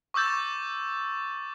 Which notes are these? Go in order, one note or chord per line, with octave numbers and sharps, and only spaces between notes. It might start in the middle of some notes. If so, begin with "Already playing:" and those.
C#6 D6 E6 G6 A6